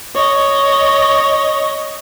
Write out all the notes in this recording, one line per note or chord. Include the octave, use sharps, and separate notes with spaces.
C#5 D#5